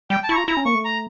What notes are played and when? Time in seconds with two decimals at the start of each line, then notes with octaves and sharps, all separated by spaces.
0.10 G3 G5
0.24 A5
0.29 E4 C#6
0.35 F4 A#5
0.47 E4 A#5
0.57 C#4
0.65 A#3 C#6
0.75 A3
0.85 A#5